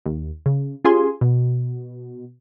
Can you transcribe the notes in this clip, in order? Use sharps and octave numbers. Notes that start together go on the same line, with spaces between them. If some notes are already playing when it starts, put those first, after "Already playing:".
D#2
C#3
C#4 F4 G4 G#4 G#5 C6
B2